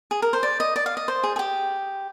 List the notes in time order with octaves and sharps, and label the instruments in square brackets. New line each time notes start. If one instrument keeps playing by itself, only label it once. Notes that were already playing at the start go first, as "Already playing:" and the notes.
[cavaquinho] G#4
A#4
C5
D5
D#5
D5
F5
D#5
C5
G#4
G#4
G4